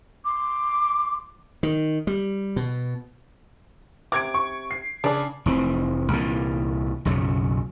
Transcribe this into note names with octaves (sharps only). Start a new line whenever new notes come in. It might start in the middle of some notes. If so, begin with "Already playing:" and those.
C6 D6
D#3
G3
B2
C3 D6 G#6 D7
C#6
C7
C#3 D4 D5
F1 E3 C4
C2 A#2 E3
B1 F#2 C#3 F#3